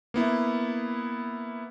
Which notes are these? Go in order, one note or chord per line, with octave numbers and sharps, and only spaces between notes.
A#3 B3 E4